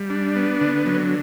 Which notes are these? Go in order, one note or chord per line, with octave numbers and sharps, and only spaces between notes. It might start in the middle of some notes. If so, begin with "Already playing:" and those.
Already playing: G3
D4
B3
D3
F#3